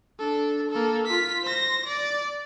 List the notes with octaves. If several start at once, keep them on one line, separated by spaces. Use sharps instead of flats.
D4 A4
A#3 A4
F4 B6
C5 A#6
D5